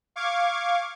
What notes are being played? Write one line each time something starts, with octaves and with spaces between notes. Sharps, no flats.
F5 C#6 D6 G#6